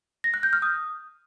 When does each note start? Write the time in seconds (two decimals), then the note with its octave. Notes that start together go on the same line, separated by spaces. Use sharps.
0.24 A#6
0.34 F#6
0.43 G6
0.53 F6
0.62 D#6